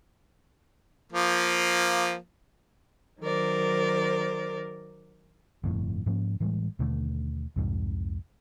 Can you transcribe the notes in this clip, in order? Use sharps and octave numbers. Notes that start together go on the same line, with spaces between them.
F3 A#3
D#3 F#3 A#4 C5 D5
G1 F2 A2
G#2 F3 A#3 C#4
A2 E3 G3 G#3
D#2 B2 D3 A3
C2 F2 G#2 C3